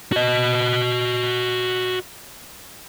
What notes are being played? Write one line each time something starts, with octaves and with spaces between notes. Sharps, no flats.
F#4 D#5